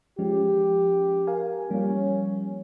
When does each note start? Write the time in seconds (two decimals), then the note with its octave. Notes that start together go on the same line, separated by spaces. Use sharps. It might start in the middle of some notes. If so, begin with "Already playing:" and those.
0.19 F3 G#3 C#4 G4
1.27 A#4 F5 G#5
1.71 F3 G3 A#3 C#4